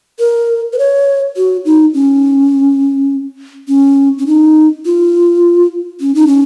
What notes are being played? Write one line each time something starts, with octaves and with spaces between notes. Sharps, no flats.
A#4
B4
C#5
F#4
D#4
C#4
C#4
C#4
D#4
F4
C#4
D#4
C#4